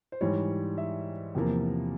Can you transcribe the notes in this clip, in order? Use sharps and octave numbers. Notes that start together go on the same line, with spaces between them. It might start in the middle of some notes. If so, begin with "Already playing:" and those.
C5
G#2 E3 G3 C#5
E5
E2 C3 F3 A#3